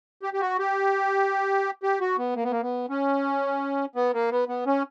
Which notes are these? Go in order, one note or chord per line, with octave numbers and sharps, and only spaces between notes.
G4
G4
F#4
G4
G4
F#4
B3
A#3
B3
A#3
B3
C#4
B3
A#3
B3
B3
C#4